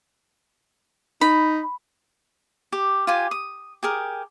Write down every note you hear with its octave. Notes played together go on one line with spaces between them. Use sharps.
D#4 B5
G4
F4 G4 G#5
D#6
G4 G#4 A#4